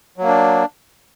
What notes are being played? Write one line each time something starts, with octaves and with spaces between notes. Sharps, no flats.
F#3 A#3 D4